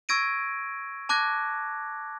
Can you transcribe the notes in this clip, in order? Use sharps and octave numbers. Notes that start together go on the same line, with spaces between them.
C#6 E6 G#6 A#6 D7 D#7
A5 D6 F#6 G#6 A#6